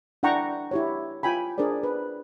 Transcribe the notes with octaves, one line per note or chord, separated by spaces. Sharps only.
D4 E4 F#5 G5 A#5 C#6
E4 G4 C#5
F4 G5 G#5 B5
D4 G#4 A#4 C5 D5
B4